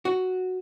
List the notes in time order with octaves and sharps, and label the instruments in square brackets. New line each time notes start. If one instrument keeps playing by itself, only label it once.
[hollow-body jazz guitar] F#4